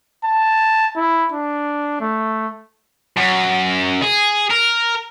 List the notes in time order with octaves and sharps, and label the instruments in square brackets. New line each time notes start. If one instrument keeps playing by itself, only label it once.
[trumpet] A5
E4
D4
A3
[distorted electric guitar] F#2
G#4
A#4